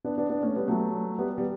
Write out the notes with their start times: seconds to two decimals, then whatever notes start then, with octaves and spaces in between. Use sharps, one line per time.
0.04 B3 D4
0.18 B3 D4
0.30 B3 D4
0.43 A3 C#4
0.56 G3 B3
0.68 F#3 A3
1.18 G3 B3
1.38 G3 B3